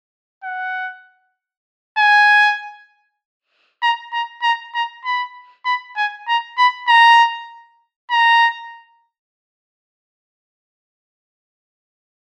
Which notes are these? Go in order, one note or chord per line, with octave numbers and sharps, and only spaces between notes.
F#5
G#5
A#5
A#5
A#5
A#5
B5
B5
G#5
A#5
B5
A#5
A#5